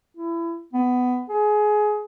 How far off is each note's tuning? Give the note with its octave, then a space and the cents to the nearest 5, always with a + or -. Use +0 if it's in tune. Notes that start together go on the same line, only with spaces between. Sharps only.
E4 +25
B3 +15
G#4 +20